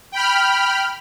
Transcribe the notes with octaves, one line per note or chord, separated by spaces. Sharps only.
G5 B5 F6